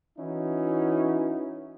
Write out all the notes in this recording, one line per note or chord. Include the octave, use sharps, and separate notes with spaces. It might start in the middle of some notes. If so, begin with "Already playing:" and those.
E3 C#4 D#4 E4 F#4